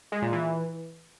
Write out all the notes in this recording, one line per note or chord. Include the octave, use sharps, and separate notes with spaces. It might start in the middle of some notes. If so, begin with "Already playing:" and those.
G#3
A#2
E3